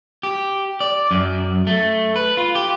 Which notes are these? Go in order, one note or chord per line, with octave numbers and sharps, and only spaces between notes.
G4
D5
F#2
A3
B4
F4
G4